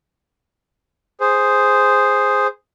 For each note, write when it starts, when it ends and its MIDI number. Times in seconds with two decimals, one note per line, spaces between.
1.20 2.47 68
1.20 2.47 72